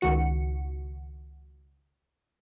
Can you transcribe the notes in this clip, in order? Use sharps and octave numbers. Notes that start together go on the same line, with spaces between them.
C#2 D#3 F#4 C#7